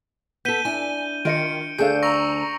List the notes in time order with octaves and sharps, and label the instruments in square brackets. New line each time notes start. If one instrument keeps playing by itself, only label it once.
[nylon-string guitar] B3 A4 [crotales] G6 D#7 G7 [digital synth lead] B6
[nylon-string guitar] D4 E4 [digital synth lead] G#5
[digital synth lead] D#3 [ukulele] F4 A#4 D#5 [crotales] C#7 D7
[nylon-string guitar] D2 D4 [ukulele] G#4 A4 F5 [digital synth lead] G6
[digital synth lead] A#5 [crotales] C#6 E6 A#6